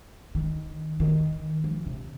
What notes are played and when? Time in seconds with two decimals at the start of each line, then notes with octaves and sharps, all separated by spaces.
0.35 D#3
1.00 D#3
1.64 F3
1.86 C3